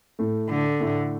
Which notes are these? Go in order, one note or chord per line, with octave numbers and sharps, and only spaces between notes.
A2 A3
D3
A2 A3